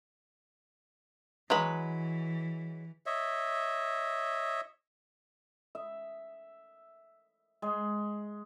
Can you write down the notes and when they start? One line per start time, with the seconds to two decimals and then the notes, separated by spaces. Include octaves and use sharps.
1.50 E3 F#3 G#3 B4
3.06 C#5 D#5 E5
5.75 E5
7.62 G#3